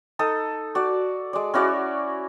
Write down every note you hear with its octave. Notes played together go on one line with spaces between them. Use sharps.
D#4 A4 D#6
F#4 D5
G#3 D5
C#4 E4 F#4 D5